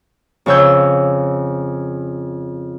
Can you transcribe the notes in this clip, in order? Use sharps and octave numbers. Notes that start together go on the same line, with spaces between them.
F2 C#3 C#5 E6 G6